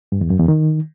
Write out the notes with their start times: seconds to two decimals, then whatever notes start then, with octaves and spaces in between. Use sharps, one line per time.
0.12 G2
0.21 E2
0.30 F#2
0.39 E2
0.48 D#3